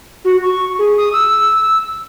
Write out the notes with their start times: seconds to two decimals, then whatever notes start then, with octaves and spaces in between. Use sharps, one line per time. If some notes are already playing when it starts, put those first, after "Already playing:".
0.24 F#4
0.42 C#6
0.79 G#4
0.97 D#6
1.13 E6